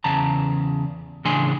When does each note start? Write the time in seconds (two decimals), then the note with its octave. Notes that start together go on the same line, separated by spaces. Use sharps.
0.04 E2 C#3 A5 A#5
1.25 A2 C#3 E3 D4 G#5 C6